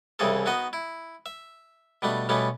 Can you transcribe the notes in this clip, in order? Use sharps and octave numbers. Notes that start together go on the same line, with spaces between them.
C2 C#3 E3 C4 G#4 A4
B3 D#4 F#4 D#5
E4
E5
B2 G3 A3 D4
B2 G3 A3 B3 C#4